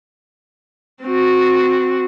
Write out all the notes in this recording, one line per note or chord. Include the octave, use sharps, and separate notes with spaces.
C4 F#4